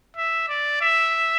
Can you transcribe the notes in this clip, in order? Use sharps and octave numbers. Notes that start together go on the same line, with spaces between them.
E5
D5
E5